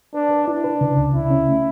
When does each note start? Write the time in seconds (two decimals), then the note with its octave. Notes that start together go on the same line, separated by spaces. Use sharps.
0.14 D4 B4
0.31 B4
0.47 D4 E4
0.64 B4
0.81 C#3
0.97 C#2
1.14 C#3 E4
1.30 C#4
1.48 A3